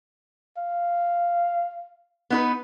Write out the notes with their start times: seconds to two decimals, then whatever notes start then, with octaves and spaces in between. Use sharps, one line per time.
0.57 F5
2.30 B3 D#4 B4